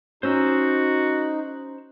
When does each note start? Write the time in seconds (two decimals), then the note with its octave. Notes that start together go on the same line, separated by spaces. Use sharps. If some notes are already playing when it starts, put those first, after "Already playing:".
0.23 C#4 D#4 F#4 C5 E6